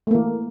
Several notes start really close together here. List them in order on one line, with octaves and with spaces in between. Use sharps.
A3 A#3 E3